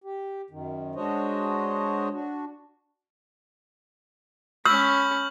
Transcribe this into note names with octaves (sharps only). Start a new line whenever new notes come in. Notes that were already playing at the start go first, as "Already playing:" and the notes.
G4
F#2 D#3
G#3 D4 F#4 C5 C#5 D#5
D4 F#4
C#4 B5 C#6 E6 F6 G6 F#7